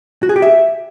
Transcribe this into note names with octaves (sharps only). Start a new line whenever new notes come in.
F#4
G#4
G4
E5